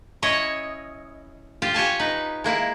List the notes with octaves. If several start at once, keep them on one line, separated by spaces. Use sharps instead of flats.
C#4 E4 C#5 D#5
F4 G4 F5
G4 C#5 G#5 A5
D#4 B4
G#3 A#3 E4